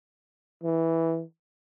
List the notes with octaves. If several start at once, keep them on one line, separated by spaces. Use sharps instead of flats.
E3